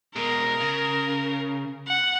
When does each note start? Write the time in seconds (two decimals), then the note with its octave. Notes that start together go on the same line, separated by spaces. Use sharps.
0.16 B2 G#3 A#4
0.61 C#3
1.88 F#5